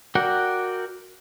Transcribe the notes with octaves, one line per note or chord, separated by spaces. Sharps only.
F#4 A#4 D5 F#5 G5